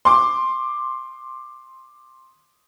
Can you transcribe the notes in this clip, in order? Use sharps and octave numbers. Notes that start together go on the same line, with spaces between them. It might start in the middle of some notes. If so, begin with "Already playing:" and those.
C6 D6